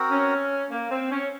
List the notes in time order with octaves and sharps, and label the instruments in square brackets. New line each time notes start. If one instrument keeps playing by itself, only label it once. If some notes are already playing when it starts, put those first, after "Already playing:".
Already playing: [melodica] C4 F#4 A#4
[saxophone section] C#4
A#3
C4
C#4